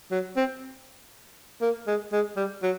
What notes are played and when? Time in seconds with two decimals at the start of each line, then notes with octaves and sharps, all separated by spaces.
0.11 F#3
0.36 C4
1.62 A#3
1.87 G#3
2.12 G#3
2.37 G3
2.63 F#3